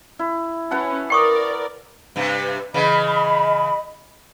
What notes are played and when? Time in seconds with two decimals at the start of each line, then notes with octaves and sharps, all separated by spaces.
0.19 E4
0.71 C#4 B4 F#5 A5
1.10 A#4 D5 G5 C#6 D#6
2.16 G2 C3
2.74 C#3 E3 D#5 B5